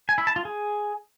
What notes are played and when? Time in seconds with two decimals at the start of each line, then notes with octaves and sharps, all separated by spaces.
0.09 G#5
0.18 E4
0.27 A5
0.36 F4
0.45 G#4